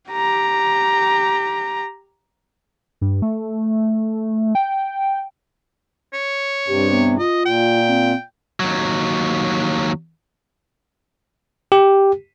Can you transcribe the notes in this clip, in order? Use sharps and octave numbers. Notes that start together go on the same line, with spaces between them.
G4 A#5
G2
A3
G5
C#5
G2 C3 G4
B3
F4 D#5
A#2 G5
C4
D#2 F#3
G4